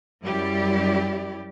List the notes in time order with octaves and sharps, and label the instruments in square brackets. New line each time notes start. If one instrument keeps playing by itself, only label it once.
[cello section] F#2 G3 E4 G4 D5